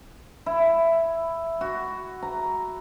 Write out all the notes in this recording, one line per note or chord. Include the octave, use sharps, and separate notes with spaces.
E4
F#4
A#5